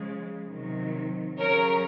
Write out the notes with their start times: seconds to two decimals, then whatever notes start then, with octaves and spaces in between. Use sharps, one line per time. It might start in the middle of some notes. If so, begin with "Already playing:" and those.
Already playing: C#3 F3 G#3
0.48 C3 D#3 F#3
1.38 C#3 F#3 A#4 C#5